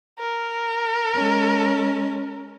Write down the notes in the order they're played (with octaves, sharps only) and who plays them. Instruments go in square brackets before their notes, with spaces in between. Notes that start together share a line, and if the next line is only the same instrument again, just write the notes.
[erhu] A#4
[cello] G#3 C#4